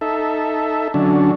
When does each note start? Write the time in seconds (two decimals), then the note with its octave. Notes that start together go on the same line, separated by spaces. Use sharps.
0.01 D#4 A4 E5
0.94 D3 F#3 C#4 D4